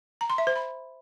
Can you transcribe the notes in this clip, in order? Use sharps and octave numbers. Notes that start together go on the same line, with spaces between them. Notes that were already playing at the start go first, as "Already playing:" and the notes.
A#5
C6
E5
C5
B5